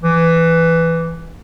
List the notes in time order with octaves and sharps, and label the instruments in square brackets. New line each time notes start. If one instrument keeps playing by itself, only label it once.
[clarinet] E3